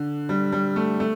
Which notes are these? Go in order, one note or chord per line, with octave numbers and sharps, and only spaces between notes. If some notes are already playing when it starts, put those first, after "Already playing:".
Already playing: D3
G3
G3
A3
A3